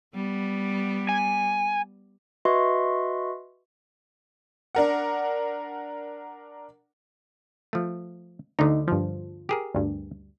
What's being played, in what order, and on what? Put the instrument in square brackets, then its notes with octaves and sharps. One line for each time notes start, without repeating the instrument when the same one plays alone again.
[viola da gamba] G3 B3
[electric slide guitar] G#5
[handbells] F#4 B4 D#5 E5 C6 C#6
[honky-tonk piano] D4 A#4 F#5
[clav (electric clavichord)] F3 A3
[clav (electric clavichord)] D2 D3 [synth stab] D#4
[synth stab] G2 F3
[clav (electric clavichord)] G4 G#4 A#4
[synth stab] D2 G2